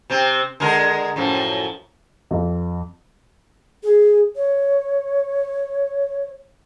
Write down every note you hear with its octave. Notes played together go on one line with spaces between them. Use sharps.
C3 C4
D3 G#3 A#4
F#2 A2 F3
F2
G#4
C#5